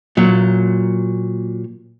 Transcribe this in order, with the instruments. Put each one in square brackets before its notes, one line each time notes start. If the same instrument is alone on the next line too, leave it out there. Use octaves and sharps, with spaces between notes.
[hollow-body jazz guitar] A#2 F#3